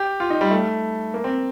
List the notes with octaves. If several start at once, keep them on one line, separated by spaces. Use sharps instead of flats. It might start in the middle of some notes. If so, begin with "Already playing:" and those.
Already playing: G4
F4
D#4
G3
A3
A#3
C4